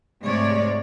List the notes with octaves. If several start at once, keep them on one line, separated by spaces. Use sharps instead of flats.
G#2 C3 G#3 A3 C#5 D5